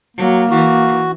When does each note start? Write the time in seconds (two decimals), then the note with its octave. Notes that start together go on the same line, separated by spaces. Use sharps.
0.17 F#3 A#3
0.50 E3 F#4